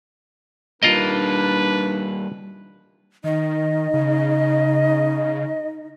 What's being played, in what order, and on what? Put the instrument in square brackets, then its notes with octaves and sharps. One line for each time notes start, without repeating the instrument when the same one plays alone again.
[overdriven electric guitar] G3 A#3 [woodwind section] D4 D#4 [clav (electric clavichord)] F4 A#4 D#5 [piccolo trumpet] B4
[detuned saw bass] D#3 [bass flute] D#4 [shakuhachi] D#5
[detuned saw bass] C#3